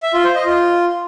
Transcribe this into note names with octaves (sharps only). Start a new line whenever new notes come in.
E5
F4
C5
D#5
F4